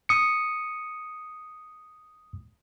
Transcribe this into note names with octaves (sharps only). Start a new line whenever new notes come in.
D#6 C#7